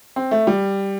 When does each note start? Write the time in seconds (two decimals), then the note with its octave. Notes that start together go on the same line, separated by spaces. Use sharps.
0.16 C4
0.31 A3
0.47 G3